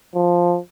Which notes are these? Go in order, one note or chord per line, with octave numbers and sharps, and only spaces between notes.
F3